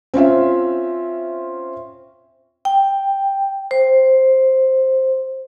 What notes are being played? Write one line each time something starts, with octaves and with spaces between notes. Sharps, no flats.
C4 C#4 F4 E5
G5
C5